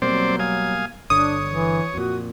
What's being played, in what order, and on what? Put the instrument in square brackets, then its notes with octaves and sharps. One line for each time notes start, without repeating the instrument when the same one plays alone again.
[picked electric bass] B2 G3 A#3 [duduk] F#3 [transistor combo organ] C4 C5 D5
[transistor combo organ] F5 G#5 D#6
[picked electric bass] G1 D3 [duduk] D4 [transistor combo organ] C#5 [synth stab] D#6
[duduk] E3
[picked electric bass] F2 A#2 [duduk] F#4